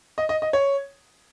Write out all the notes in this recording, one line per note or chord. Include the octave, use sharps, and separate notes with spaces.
D#5
D#5
D#5
C#5